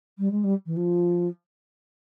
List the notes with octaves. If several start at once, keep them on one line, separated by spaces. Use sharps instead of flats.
G3
G#3
G3
E3
F3